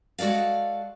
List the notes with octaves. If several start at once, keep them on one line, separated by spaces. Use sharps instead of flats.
G#3 F#4 A4 D5 F5